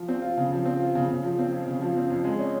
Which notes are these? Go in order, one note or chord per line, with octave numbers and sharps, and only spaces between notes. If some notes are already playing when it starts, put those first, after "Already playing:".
Already playing: F3
C4
F4
C#3
F3
C4
F4
C#3
C#3
F3
C4
F2
C#3
F3
C4
F2
G#3
C#4